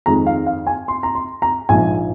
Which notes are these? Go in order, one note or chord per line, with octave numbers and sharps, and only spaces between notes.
F2 D#3 G#3 A#5
F5
F5
G#5
C6
A#5
C6
A#5
A#1 G#2 F3 G#5